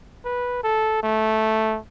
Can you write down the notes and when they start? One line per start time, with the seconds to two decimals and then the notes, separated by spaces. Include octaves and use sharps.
0.25 B4
0.64 A4
1.03 A3